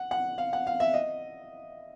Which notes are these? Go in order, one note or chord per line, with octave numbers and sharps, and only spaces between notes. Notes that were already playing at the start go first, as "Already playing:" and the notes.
Already playing: F#5
F#5
F5
F#5
F5
E5
D#5